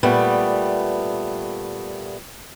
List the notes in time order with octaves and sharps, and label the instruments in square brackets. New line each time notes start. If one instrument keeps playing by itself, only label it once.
[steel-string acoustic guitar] A#2 G3 A3 B3